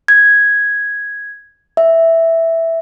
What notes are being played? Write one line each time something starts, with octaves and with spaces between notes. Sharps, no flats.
G#6
E5